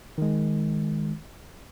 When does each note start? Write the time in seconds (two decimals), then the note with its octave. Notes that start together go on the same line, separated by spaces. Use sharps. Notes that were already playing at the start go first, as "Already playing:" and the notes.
0.18 D#3 G#3